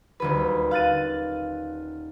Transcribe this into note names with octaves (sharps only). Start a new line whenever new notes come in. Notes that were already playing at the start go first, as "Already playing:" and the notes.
D#1 D2 B4
F5 F#6 A6 D#7